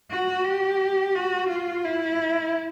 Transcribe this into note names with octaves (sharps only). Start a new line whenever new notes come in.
F#4
G4
F#4
F4
E4